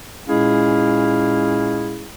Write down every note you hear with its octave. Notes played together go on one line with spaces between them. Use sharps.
A#2 G#3 C#4 E4 G#4 F5